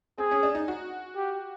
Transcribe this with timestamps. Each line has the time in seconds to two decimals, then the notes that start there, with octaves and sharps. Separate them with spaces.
0.18 C4 G#4
0.31 C#4
0.43 D4
0.55 D#4
0.68 F#4
1.16 G4